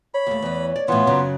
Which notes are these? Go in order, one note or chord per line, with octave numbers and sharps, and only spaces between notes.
C#5 B5
D#2 A3
E2 E3
D5
A2 E3 B3 F4
F#2 C#3 F#3